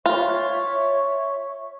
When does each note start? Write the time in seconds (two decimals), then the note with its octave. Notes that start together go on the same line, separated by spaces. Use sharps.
0.06 F4 C#5 E5 C#6